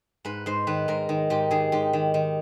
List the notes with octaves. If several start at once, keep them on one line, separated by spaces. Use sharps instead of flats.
G#2 B4
G#2 C5
D#3 B4
G#2 A#4
D#3
G#2 G4
D#3 G#4
G#2 G4
D#3
D#3